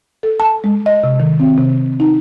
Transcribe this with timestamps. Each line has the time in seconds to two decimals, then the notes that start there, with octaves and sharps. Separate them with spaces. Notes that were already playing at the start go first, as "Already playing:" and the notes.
0.23 A4
0.40 A5
0.64 G#3
0.86 D#5
1.04 C3
1.20 D#3
1.40 C4
1.58 C3
2.00 D#4